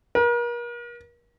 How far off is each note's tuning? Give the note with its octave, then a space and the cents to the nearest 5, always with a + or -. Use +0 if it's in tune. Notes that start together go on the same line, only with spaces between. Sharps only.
A#4 +40